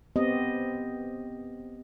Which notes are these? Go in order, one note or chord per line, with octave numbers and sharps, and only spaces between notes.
B3 C4 G4 D#5